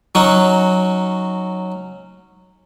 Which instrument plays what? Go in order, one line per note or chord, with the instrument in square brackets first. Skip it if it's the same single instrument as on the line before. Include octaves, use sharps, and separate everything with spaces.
[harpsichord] F#3 C#4 D#4 F#4